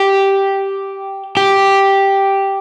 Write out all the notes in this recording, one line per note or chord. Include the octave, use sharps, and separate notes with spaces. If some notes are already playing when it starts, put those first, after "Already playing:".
Already playing: G4
G4